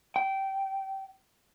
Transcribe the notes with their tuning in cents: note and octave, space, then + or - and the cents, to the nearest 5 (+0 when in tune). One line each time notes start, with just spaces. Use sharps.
G5 -20